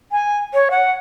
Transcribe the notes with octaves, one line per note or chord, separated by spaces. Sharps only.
G#5
C#5
F#5